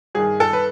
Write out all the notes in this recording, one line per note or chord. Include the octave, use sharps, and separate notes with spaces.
G2 D#3 G#4
A4
B4